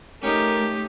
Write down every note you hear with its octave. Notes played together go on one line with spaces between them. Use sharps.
A3 C#4 D#4 G4 A#4